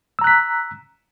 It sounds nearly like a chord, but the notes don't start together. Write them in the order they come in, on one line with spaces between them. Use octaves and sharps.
E6 A#5 F#6 B6